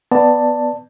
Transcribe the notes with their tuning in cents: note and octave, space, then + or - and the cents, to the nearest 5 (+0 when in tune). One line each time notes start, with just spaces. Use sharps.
B3 +0 D5 +0 A5 +10